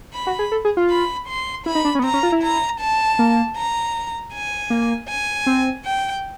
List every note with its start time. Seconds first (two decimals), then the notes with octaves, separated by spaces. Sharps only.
0.13 B5
0.27 F#4
0.39 G#4
0.52 A4
0.65 G#4
0.77 F4
0.90 B5
1.28 C6
1.66 E4 B5
1.75 D#4
1.85 D4
1.95 C#4
1.99 B3
2.03 C4 A#5
2.14 C#4
2.23 F4
2.32 E4
2.42 A#5
2.80 A5
3.19 A#3
3.56 A#5
4.33 G#5
4.70 A#3
5.09 G#5
5.46 C4
5.85 G5